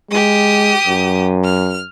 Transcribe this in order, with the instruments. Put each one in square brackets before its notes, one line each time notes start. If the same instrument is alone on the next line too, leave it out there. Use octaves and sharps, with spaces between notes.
[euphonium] G#3 [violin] G4 D#6
[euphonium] F#2
[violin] F6